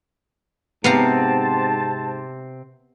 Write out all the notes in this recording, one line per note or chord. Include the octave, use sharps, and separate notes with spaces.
G#2 C3 B3 C4 C5 F5 A5 A#5